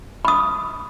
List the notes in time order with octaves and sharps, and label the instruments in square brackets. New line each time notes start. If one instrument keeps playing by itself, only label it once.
[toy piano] B5 D#6